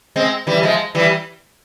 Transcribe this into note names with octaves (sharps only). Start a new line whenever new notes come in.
G#3 C4
E3 G3
F3 G#3
E3 G3